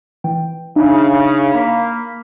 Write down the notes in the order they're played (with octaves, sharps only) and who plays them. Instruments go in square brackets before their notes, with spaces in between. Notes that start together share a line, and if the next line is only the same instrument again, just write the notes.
[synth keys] E3 G5
[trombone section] C#3 [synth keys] D4 D#4 E5
[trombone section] A#3 [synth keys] B5 B6